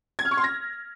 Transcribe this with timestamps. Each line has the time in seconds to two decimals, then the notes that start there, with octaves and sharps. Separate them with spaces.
0.19 G#6
0.25 F6
0.31 C#6
0.37 C6
0.44 A#6